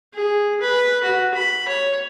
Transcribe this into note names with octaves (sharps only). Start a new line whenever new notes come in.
G#4
B4
F#4
B5
C#5